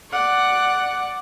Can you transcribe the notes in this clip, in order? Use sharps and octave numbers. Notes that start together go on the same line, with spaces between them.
D5 F#5